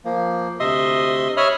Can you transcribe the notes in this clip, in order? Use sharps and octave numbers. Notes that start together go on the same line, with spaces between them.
F3 A#3
D2 C3 D#5 E5 C6 D#6
C#5 E5 B5 D#6 F6